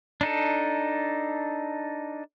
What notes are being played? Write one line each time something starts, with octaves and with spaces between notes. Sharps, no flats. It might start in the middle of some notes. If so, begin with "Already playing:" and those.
D4 D#4 A4